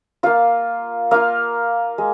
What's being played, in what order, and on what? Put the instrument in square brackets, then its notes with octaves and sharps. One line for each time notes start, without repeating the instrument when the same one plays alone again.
[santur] A#3 F4 F5
A#3 F4 F5
G#3